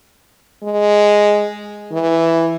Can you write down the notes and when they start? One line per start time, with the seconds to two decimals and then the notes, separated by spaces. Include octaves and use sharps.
0.64 G#3
1.92 E3